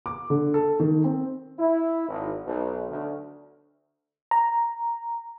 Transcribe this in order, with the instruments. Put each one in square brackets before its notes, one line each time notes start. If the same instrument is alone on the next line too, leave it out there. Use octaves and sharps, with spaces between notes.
[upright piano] D6
D3
A4
D#3
C4
[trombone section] E4
G#1
B1
D2
[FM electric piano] A#5